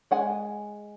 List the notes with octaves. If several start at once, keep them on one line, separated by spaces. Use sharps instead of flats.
G#3 F#5 G#5